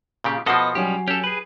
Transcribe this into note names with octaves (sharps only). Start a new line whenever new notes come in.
A#2 C#3 G4
B2 F3 B3 A4 D#5 F#5 B5 C7
F#3 G3 C#4 G4 C#5 G#5
C#4 G4 A4
G#4 B4